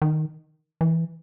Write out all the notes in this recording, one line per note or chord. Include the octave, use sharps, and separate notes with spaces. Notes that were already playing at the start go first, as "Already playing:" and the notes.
D#3
E3